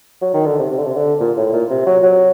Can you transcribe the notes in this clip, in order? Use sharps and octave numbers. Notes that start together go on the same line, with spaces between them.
F#3
D#3
D3
C3
C3
D3
C3
D3
A#2
A2
A#2
C3
F#3
F#3